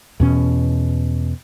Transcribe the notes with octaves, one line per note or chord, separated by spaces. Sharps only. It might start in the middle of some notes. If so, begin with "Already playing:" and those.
E2 B2 C#4